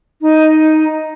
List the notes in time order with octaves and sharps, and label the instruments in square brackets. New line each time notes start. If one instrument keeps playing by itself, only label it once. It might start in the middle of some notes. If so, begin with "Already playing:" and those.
[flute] D#4